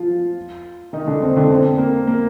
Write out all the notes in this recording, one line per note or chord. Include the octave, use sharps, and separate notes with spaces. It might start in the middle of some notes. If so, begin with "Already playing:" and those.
Already playing: F3 F4
D#3 D#4
D3 D4
C4
D3 D4
C4
A#3
A#3